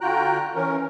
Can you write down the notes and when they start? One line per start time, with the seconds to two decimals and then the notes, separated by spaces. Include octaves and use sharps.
0.01 D3 F4 F#4 G5 A#5 F#6
0.55 E3 C#4 A#4